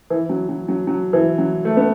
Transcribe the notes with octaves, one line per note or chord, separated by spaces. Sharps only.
E3
F#3
F#3
F#3
F#3
E3
F#3
A3
B3